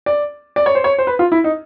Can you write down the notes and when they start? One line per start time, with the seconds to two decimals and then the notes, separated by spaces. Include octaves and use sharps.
0.06 D5
0.56 D5
0.66 C#5
0.75 C5
0.84 C#5
0.99 C5
1.07 B4
1.19 F4
1.32 E4
1.44 D#4